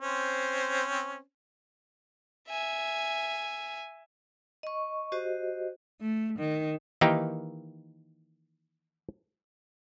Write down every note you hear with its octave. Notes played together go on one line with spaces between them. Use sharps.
C4 C#4 C5
E5 G#5
D#5 C#6
F#4 G4 C5 D#5
A3
D#3
D#3 E3 A#3 D#4 G4 G5